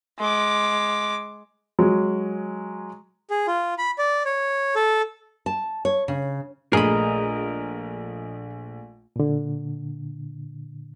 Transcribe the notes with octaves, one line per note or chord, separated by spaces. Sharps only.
G#3 D6
F#3 G#3
G#4
F4
B5
D5
C#5
A4
A5
C#5
C#3
A#1 A3 G#4 A#4 D#5 B5
A#2 D3